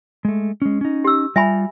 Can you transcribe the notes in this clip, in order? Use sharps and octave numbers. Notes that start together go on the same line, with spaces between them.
G#3 A3
G#3 C#4
C#4 D#4
G4 E6
G3 F4 E5 G#5 B5